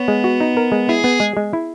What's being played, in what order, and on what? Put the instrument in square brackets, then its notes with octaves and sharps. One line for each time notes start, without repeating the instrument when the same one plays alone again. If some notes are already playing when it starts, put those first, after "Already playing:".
Already playing: [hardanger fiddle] B3 [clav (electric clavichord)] C#5
[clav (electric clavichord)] G#3
F#4
D#4
A#4
G#3
[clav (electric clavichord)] E4 [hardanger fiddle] G#4
[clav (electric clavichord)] B3
G#3
G#3
E4